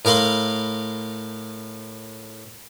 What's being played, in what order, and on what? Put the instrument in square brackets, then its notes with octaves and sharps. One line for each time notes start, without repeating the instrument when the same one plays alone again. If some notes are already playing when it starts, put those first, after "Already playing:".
[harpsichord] A2 A#4 F5 B5 C6